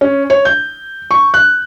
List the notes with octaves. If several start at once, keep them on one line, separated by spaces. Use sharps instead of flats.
C#4
C#5
G6
C#6
F#6